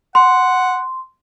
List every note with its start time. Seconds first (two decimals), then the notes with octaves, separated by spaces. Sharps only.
0.15 F#5 C6